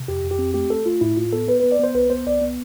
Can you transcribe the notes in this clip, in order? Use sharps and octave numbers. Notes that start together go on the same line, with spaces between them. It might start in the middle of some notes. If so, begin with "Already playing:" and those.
Already playing: C3
F2 G4
F2
G4
C4
A3 G4
A3 A4
A3 F4
A2 E4
A2 F4
B3 A4
B3 B4
B3 B4
D5
B3 C5
C2 B4
B3 C5
C2 D5
B3